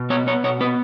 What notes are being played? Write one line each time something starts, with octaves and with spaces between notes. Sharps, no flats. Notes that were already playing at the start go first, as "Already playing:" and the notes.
Already playing: B2
B3 C#5
B3 C#5
B2 C#5
B3 B4